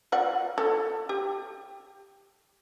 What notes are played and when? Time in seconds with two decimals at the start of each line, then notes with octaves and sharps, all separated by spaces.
0.12 F4 D5 F#5
0.58 A4
1.09 G4